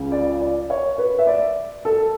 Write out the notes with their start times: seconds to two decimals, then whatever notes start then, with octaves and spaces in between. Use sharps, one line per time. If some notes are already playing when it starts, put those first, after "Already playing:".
Already playing: C#2 C#3
0.12 D5
0.41 D5
0.70 C#5
0.98 B4
1.19 E5
1.27 D5
1.85 A4